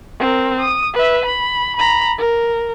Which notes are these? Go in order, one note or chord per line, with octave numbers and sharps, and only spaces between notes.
C4 A#4
D#6
B4 E5
B5
A#5 B5
A#4